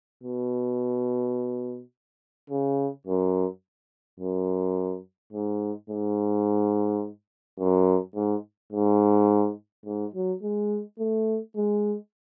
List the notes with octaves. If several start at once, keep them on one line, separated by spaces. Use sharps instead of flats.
B2
C#3
F#2
F#2
G#2
G#2
F#2
G#2
G#2
G#2
F#3
G#3
A3
G#3